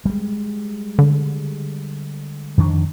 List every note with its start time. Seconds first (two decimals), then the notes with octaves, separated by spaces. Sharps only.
0.05 G3 G#3
0.99 D3
2.58 F2 D#3 D4